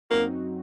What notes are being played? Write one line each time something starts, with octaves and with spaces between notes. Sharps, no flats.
F#2 F#3 A#3 C4 D#4 F#4